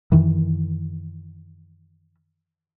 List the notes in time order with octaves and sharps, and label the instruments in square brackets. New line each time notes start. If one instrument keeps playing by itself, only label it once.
[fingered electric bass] F#2 D#3 E3